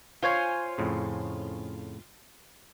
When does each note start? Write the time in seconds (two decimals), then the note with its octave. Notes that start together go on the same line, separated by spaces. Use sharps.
0.23 F4 C5 C#5 G#5
0.78 F2 A2 C#3